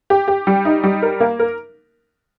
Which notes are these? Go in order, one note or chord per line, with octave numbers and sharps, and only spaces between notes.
G4
G4
G3
D#4
G3
A#4
A#3
A#4